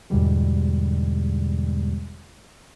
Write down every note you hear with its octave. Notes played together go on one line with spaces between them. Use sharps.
E2 G#2 B2 D3 G3 G#3